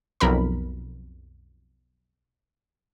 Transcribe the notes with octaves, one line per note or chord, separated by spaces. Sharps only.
B1 F2 A#4 B5